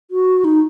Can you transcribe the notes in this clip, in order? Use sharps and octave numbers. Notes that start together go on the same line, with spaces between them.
F#4
D#4